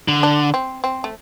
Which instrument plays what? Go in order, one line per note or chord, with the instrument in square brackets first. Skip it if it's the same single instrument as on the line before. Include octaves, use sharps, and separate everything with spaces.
[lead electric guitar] D3
[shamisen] D4
C4
C4
A3